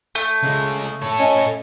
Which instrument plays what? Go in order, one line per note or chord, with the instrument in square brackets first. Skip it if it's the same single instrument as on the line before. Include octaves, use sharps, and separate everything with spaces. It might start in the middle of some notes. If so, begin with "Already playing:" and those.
[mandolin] A3
[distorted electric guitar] C#2 G#3
A4 C#5
[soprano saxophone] C#4 [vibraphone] D#5